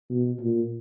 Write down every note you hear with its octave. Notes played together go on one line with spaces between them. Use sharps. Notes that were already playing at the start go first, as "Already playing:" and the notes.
B2
A#2